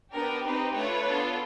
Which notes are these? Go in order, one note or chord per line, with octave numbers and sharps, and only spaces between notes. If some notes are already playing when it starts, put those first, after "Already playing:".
B3 D4 G4 A#4
C4 D#4 G4 B4
A3 D4 F4 B4 C#5
B3 D4 F4 A4